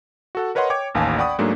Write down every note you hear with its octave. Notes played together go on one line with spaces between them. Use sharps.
F#4 A4 F#5
A#4 B4 C#5 D#5 F#5 C6
C#5 G5 D6 G#6
A1 D#2 A#3 F5 G#5 A5
D5 F#5 G5 B5 C#6 D#6
G#2 F#3 A3 A#3 D4 G#4